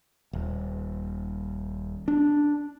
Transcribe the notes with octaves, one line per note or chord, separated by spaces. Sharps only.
D#1
D4